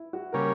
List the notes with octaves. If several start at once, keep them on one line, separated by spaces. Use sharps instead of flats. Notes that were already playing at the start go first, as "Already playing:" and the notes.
Already playing: E4
F#4
C#3 G3 A#3 C#4 A#4